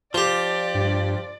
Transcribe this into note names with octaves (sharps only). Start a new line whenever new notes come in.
F3 F4 G4 D5
G2